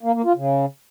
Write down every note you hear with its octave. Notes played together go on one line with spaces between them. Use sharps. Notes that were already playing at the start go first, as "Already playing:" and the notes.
A#3
A#3
F4
C#3